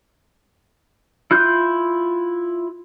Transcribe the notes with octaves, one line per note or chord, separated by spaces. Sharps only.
E4 F4 F#6 G6